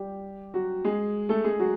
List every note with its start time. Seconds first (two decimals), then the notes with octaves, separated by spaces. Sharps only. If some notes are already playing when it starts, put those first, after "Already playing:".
Already playing: G3 G4
0.54 F#3 F#4
0.84 G#3 G#4
1.29 A3 A4
1.44 G#3 G#4
1.59 F#3 F#4